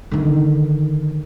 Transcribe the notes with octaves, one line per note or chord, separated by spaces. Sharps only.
D3 D#3